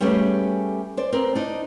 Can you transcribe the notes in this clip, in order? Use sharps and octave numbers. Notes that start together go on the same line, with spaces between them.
G3 A3 B3 C#4 G4 G#4
C5 D5
C4 A#4
D4 D#4